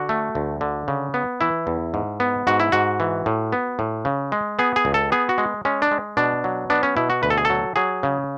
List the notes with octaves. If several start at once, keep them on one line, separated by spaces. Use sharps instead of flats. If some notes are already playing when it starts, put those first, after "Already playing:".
Already playing: D3 F#4
A3
D2
D3
C#3
B3
E3 E4
E2
G#2
B3
G#2 F#4
E4
G#2 F#4
E3
A2
B3
A2
C#3
G#3
B3 G#4
G#4
C#2
A4
B3 G#4
F#4
G#3
G#3 C#4
D4
G#3
B2 D4
F#3
B3 D4
C#4
B2 E4
F#4
D2 B4
A4
G#4
A4
F#3
F#3 G#4
C#3